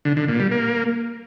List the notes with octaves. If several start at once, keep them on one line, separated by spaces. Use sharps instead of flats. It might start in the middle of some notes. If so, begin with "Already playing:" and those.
D3
D3
A#2
G3
A#3